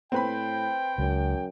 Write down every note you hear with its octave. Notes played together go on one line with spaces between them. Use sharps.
A2 C4 B4 G5 B5
C#2 F#2